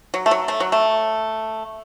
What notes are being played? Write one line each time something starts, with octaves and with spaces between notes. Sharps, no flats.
F#3
A3
F#3
A3
F#3
A3